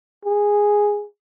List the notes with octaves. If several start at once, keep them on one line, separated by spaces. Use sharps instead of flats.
G#4